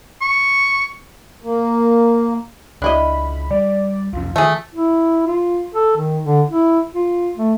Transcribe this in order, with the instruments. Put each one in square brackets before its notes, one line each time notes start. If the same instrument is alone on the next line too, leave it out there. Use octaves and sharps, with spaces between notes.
[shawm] C#6
[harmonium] A#3
[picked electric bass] C#2 [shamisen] D4 E4 D#5 [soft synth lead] B5
[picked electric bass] G3 [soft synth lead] D5
[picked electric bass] C2 F2 C#4 [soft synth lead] F4
[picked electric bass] D#3 E3 [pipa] A3 G#4
[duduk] E4
F4
A4
D#3
D3
E4
F4
A3